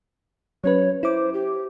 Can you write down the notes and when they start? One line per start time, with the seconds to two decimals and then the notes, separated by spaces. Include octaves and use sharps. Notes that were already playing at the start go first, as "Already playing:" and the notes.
0.64 F#3 C#4 B4 C#5
1.03 E4 C5 D6
1.34 G4